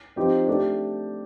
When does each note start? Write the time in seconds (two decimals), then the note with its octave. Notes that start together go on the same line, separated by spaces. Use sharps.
0.16 F3 C4 D#4 G4
0.47 A3 D4 G4